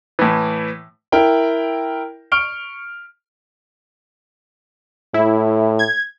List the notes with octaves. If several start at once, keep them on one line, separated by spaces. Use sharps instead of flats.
A2 E3
E4 A#4 G5
C#6 F6 D7 G7
A2 E4
G#6